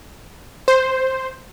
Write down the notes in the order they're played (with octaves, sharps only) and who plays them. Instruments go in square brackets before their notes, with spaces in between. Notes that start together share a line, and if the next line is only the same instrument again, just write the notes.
[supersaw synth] C5